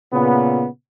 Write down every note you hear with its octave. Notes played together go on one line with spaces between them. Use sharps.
A#2 C#3 B3